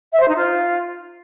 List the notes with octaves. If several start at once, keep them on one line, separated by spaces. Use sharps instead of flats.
E5
C5
D#4
F4